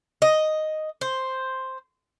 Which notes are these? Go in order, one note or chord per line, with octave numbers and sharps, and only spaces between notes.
D#5
C5